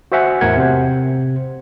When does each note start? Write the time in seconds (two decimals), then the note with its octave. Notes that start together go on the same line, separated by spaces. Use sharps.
0.12 F#4 C5 E5 F#5 G#5
0.41 E2 A2 A#4 F#5 G#6
0.57 C3 C5